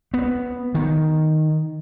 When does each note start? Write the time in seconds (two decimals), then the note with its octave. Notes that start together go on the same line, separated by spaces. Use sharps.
0.14 B3
0.75 D#3